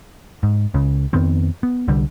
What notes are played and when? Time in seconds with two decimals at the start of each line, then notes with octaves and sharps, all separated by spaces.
0.43 G#2
0.74 C#2 C#3
1.13 F2 D#3 B3 C4
1.63 B3
1.88 C2 D3 G3